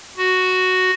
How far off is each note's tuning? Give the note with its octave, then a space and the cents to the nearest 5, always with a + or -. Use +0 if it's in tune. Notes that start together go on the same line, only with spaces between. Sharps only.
F#4 +0